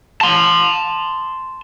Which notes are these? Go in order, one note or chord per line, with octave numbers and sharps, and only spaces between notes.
A5 C6